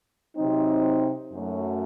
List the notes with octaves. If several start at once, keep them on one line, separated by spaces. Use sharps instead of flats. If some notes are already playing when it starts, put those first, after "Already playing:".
C3 F#3 C4 D#4
F#2 F#3 A3